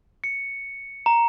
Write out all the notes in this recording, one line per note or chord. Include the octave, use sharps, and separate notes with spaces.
C#7
A#5